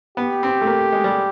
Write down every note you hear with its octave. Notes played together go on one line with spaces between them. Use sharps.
B3 G4
C4
A3
A#3
G#3
G3